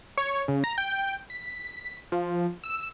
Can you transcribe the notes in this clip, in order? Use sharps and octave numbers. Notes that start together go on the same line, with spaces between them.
C#5
C#3
A#5
G5
B6
F3
E6